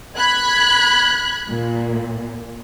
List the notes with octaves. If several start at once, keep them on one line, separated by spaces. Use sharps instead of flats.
B5 F#6 G#6
A#2